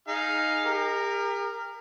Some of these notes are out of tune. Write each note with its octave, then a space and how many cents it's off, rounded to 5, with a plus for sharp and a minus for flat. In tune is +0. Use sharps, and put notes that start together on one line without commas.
D#4 +0 G#4 +5 F5 +0
G4 +40 A#4 -10